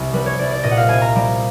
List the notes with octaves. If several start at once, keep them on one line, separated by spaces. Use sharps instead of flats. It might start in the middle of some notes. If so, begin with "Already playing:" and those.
Already playing: C2
G3 B4
C#5
C2 D5
D5
A#2 D#5
F#5
F5
C2 G#5
A#5
G3